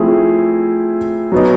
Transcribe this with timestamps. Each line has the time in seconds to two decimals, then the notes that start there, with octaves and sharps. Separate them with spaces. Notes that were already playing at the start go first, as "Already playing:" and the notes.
Already playing: F3 A3 C4 E4 G#4
1.32 F#3 B3 D#4